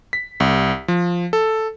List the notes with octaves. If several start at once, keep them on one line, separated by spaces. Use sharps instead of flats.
B6
C2
F3
A4